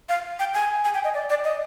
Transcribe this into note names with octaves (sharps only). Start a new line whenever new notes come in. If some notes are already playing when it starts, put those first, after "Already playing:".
F5
G5
G#5
G#5
G5
D#5
D5
D5
D#5